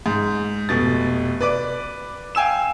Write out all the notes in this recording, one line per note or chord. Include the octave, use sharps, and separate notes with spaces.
G#2
F1 B2 A6
B4 D5 D6
F5 G5 G#5 E6 E7